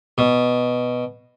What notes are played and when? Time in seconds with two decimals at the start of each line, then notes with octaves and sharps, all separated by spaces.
0.18 B2